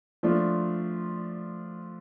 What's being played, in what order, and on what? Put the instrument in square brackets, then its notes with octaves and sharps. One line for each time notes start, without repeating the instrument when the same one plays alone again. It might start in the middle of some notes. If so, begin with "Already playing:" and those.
[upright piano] F3 A3 D4 F4